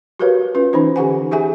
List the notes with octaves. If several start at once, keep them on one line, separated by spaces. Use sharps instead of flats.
F#4 G4 A#4 B4 C#5 F5
C#4 F4 B4
E3 C#4 D#4 C5
D3 G4 F#5 G#5
G4 G#4 E5 G#5